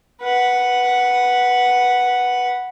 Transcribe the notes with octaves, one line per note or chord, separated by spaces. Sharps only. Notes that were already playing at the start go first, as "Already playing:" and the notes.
B4 F#5